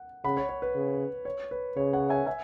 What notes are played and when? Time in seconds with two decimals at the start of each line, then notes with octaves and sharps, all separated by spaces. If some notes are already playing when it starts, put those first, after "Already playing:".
Already playing: F#5
0.24 C#3 F#5 B5
0.37 C#5
0.49 C#5
0.62 B4
0.75 C#3
1.25 C#5
1.51 B4
1.76 C#3 C#5
1.93 C#5 F#5
2.09 E5 G#5
2.26 E5 G#5